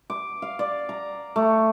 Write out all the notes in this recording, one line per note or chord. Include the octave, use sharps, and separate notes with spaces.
D6
F5
D5
A#5
A3